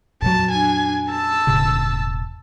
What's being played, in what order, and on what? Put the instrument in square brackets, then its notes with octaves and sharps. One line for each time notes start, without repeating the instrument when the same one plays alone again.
[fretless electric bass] F2 A#2 F#3 [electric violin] A5
[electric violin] D4 G#5
A5 E6
[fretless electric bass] E1 A2 C#3